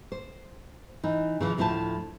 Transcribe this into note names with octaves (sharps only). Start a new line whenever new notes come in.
C5
E3 D#4
C#3 E3 F3
D2 A2 F3 E4 C5 A5